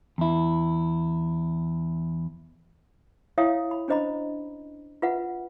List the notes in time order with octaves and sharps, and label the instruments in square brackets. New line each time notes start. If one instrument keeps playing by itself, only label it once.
[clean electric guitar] E2 E4
[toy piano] E4 C#5 E5 F5 G5 D#6
B5
C#4 D4 C5 D#5 A#5 B5
F4 B4 E5 F#5